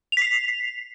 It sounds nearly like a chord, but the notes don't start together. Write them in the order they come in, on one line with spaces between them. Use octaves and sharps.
F7 B6 C7